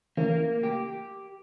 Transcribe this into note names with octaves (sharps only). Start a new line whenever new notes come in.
C#3 E3 A#3
G4